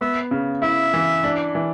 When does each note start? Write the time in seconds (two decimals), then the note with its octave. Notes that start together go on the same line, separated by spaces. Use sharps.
0.01 B3 E5
0.31 C#3
0.62 E4 E5
0.94 E3
1.24 D4
1.55 E3